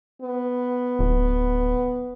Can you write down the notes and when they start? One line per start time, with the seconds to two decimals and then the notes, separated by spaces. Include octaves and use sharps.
0.22 B3
0.99 D1